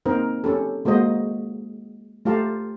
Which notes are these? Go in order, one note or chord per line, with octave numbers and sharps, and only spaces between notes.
A#3 C4 D#4 A#4 C5
C#4 G4 A4
G#3 A#3 F#4 C5 D#5
A3 F4 G4 F5 A5 A#5